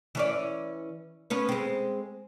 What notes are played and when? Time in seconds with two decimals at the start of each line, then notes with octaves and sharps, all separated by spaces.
0.15 E3 C#4 D5
1.30 B3 C#4 B4
1.49 G#3 C4